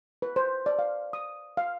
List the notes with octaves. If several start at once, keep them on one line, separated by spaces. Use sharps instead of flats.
B4
C5
D5
F5
D#6
F5